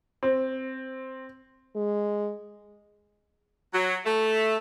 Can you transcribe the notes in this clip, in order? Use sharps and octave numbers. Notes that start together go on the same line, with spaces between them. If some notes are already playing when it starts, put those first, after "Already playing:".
C4
G#3
F#3
A3